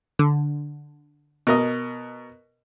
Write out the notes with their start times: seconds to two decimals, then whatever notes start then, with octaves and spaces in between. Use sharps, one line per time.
0.19 D3
1.47 B2 A#4 D#5